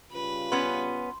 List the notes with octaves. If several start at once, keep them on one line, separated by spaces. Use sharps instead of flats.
C#3 G3 F4 B4
B3 C#4 C6